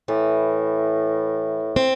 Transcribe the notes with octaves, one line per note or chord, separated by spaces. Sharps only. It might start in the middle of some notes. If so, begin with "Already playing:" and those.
A2 E3
C4